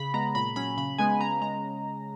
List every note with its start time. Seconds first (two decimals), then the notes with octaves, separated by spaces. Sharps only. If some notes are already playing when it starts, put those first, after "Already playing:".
Already playing: C#3 B5
0.14 G#3 B3 A#5
0.35 A#2 B5
0.56 F#3 C#4 B5
0.77 C#3 B5
0.98 G#3 B3 G#5
1.20 C#3 A#5
1.42 G#3 A#5